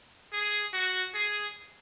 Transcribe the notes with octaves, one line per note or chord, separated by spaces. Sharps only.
G#4
F#4
G#4